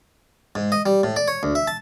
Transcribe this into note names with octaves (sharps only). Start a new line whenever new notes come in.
G#2
D#5
G3
A2
D5
C#5
D2
E5
A5